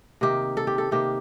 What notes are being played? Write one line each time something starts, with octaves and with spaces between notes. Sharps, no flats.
C3 D#3 A#3 G4
A4
G4
A4
C3 D#3 A#3 G4